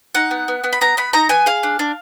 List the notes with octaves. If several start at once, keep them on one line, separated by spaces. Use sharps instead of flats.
D#4 F#5
B3
B3
B3
B5
B3 A#5
B3 B5
D#4 A#5
B3 G#5
G#4 F5
D4
D4